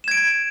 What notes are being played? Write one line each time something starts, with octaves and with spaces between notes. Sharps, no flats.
G#6 D7 E7